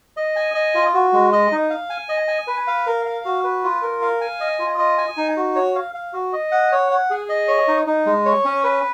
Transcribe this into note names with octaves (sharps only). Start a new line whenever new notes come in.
D#5
G#5
D#5
F4
F#4
G#3
D#5
D#4
F5
G#5
D#5
G#5
B4
F5
A#4
F5
F#4
B4
F4
A#4
F5
G#5
D#5
F4
D#5
G#5
D#4
F#4
C#5
F5
F5
F#4
D#5
F#5
C#5
F#5
G#4
D#5
C#5
D#4
D#4
G#3
C#5
C#4
B4